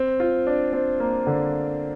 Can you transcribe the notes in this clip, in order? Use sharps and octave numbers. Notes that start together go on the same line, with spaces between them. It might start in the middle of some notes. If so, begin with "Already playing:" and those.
Already playing: C4
F4
D4
C4
A#3
D3